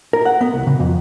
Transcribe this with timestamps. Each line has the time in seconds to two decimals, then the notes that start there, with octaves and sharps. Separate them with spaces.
0.13 A#4
0.25 F#5
0.41 B3
0.54 C2
0.67 C#3
0.80 F2